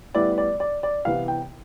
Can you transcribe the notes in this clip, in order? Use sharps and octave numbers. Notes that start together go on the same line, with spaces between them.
A2 G3 B3 E4 D5
D5
D5
D5
C2 C3 E3 B3 E4 F5
G5